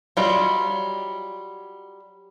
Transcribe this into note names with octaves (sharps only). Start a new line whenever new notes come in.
F#3 G3 F4 D#5